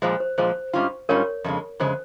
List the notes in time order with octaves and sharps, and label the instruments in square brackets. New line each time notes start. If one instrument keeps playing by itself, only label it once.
[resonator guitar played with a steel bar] A#2 F3 G#3 [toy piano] C5
[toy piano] C5
[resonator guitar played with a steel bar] A#2 F3 G#3 [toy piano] C5
[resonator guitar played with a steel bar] G#2 G3 C#4 F4
[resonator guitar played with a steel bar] G#2 G3 C#4 F4 [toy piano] A#4 C#5
[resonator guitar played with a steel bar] F2 C#3 G#3
[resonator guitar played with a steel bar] F2 C#3 G#3 [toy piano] C5